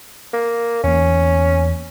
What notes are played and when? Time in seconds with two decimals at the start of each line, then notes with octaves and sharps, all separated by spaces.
0.33 A#3
0.84 E2 A#3 C#4